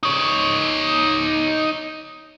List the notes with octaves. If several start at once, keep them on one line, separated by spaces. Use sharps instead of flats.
D#4 C#5